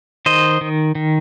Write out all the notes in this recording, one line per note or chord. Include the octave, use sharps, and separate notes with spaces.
D#3 C5 D#5
D#3
D#3